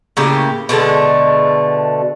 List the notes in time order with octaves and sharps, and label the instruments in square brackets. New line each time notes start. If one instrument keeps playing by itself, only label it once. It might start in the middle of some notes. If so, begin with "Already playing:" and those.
[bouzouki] A2 C#3 A#3 G4
B2 D3 G#3 A3